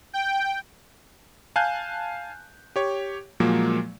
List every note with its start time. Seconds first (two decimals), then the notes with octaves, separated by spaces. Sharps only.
0.13 G5
1.56 F5 G#5 A5 F#6 G6
2.76 G4 C#5
3.40 A#2 F3 F#3 G#3 A#3